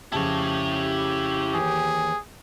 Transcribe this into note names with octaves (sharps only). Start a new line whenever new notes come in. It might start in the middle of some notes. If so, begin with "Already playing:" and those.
F2 C#3 E4 G4 C#5 A5
D#2 E3 G#4